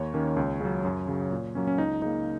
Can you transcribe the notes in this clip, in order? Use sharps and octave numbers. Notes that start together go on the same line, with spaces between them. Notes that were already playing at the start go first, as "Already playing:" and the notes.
Already playing: D#2 C#5
D#3 A#3 C#4
C#2
C#3 F#3
F#2
C#3 F#3
A#2
F#3 A#3 C#4
C#4
C#2 D#4
C#3 A#3 D#4